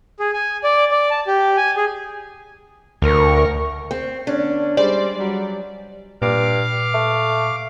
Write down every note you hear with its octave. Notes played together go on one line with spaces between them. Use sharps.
G#4
G#5
D5
D5
A5
G4
G#5
G#4
D2 A#4 C#6
C4
D3 B3 C#4 D4
G3 G#3 C5 D5
F#3 G3
G2 A#2 F5 D6
A3